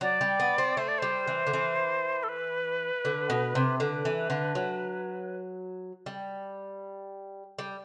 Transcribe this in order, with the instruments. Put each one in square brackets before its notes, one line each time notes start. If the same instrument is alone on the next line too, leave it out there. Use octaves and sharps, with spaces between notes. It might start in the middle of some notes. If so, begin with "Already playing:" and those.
[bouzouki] F#3 [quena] D5
[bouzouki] G3
B3
C4
[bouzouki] A3 [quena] C5
[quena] D5
[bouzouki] G3 [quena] C5
[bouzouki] E3
D3
E3
[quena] A4
B4
[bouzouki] D3
B2
C3
[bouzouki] D3 [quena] B4
[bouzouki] E3
D3
F#3
G3
G3